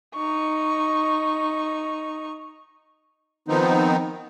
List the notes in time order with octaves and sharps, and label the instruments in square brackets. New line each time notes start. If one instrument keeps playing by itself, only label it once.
[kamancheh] D#4 C#6
[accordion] D#3 F3 B3 C4 D#4